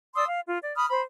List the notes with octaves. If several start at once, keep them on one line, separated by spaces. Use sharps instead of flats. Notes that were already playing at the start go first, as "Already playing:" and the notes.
D5 C6 D#6 E6
F5
F4
D5
B5 D#6 F6
C5 B5